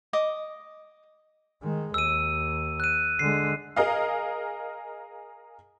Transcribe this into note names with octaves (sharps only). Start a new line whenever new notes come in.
D#5 D6 D#6
D#3 G#3
D#2 E6 D#7
F#6 D#7
D3 G#3 C7
G#4 A#4 D#5 F5